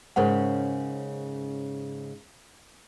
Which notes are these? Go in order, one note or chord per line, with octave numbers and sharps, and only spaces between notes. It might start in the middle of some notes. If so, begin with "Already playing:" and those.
G#2 C#3 C#4 A#4 C5 F#5